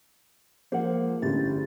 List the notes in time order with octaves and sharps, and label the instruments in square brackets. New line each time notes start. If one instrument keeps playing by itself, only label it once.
[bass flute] F3 [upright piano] G#3 A#3 [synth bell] C5 F#5
[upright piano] G1 G2 [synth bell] A3 C#4 A6 [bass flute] E4 [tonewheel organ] G4 G#4